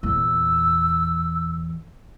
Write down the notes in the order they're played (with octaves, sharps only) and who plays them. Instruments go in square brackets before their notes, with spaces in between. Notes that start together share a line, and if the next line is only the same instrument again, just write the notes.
[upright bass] E2 A#2 [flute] E6